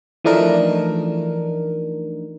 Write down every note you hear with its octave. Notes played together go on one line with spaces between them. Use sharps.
E3 F3 A3 D4 D#4 A#4